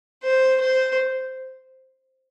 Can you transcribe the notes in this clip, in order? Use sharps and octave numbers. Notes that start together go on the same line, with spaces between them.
C5
C5